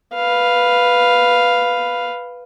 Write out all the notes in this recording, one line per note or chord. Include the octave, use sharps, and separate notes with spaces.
B4 F5